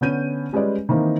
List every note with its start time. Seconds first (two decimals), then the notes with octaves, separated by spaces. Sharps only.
0.01 D3 B3 C#4 G6 D#7
0.53 G3 G#3 C#4 B4 D5 D#5
0.89 D#3 E3 A#3 C4 D#4